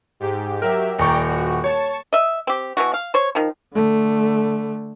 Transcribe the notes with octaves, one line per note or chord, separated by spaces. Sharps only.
G#2 G4
F#3 G4 A#4 E5
D#1 D5 G5 A#5 C#6
F#4
C#5 A5 C#6
D#5 E5
C4 G4
B2 E3 F#3 F#4
F5
C5 C#5
D#3 F3
D3 A3